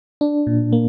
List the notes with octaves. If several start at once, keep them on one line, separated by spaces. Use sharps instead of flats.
D4
A#2
A#3